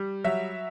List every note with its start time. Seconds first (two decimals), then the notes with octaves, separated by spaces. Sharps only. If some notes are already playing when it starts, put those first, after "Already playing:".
Already playing: G3
0.24 F#3 E5